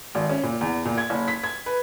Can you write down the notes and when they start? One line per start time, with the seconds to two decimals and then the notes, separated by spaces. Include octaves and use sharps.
0.15 G#1
0.29 C#4
0.43 A#2
0.61 E2
0.85 A#2
0.98 G#6
1.10 F#1
1.28 B6
1.44 G#6
1.66 B4